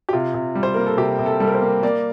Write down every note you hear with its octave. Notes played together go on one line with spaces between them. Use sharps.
G4
C3 F4
C3
G3
C5
A#3 A#4
A4
C3 G4
C3
A4
G3 A4
A#4
C5
A#3
A#3 D5